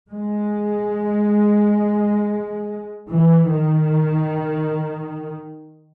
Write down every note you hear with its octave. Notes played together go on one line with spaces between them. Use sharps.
G#3
E3
D#3